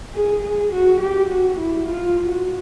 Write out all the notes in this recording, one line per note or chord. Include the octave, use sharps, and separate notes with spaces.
G#4
G#4
F#4
G4
F#4
E4
F4
F#4